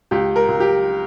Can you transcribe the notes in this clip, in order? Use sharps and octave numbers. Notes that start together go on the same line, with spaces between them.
C#2 G4
A#4
C#2
G4